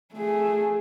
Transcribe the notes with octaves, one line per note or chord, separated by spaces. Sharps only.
A3 G#4